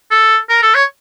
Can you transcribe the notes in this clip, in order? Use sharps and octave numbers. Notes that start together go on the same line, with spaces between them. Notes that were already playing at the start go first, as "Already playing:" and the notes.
A4
A#4
A4
C#5